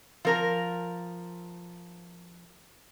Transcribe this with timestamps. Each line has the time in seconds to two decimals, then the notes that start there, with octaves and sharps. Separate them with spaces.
0.25 F3 A#4 A#5